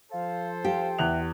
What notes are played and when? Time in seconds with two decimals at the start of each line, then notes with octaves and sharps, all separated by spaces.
0.12 F3 A4 C5 F5
0.65 G4 F5
0.98 E2 E5 F#6 F7